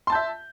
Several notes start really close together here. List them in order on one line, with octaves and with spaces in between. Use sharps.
C6 A5 G6 E5